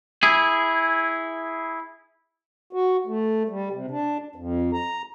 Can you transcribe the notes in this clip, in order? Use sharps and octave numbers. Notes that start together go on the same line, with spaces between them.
E4 G#4
F#4
A3
G3
C3
D4
F2
A#5